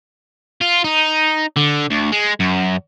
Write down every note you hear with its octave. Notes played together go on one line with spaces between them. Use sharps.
F4
D#4
D3
D2
G#3
F#2